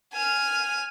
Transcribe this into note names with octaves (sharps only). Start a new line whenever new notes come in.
G#5 F6